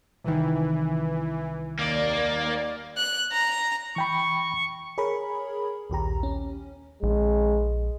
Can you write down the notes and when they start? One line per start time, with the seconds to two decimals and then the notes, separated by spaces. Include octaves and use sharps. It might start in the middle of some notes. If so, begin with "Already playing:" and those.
0.24 C2 D#3 E3
1.79 D#2 A#3 D5
2.97 F#6
3.32 A#5
3.96 E3 G5 B5 C#6
4.98 G#4 A#4 C#5 B5
5.90 A#1 D#2 G4 A#5
6.23 C#4
7.03 A#1 G#3